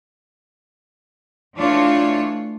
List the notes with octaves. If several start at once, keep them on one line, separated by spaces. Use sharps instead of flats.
E3 A3 D4 F4 C#5